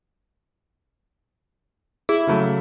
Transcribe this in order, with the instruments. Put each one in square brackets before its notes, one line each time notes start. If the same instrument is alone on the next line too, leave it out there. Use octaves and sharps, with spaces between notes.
[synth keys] E4 [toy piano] G#4
[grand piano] C#3 F#3 A3